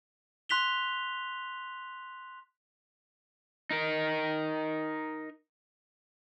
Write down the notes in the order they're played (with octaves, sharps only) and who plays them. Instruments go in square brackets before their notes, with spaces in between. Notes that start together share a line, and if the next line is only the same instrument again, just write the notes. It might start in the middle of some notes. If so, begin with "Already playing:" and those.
[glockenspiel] C6 F#6 B6 F7 G7
[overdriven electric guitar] D#4 A#4